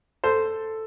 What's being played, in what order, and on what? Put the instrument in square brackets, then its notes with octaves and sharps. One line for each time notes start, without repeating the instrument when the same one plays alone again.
[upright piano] A4 [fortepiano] C5